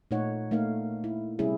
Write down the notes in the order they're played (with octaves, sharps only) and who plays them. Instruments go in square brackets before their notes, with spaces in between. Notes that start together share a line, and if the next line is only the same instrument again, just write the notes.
[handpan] A#2 A3 D#4 C#5 F#5
A3 A#3 D#4 F5
E4
C3 G3 C#4 E4 G#4